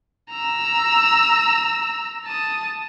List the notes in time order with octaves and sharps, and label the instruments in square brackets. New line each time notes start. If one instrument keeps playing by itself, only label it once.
[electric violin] A#5 E6
A5 D#6